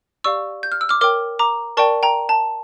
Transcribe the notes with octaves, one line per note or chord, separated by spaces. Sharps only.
G4 D5 F5 C#6 E6
G6
F6
E6
D6 F6
A#4 C#5 G5 D6 F6
A#5 D6
A#4 D5 G5 A5 C#6
G5 A#5
A5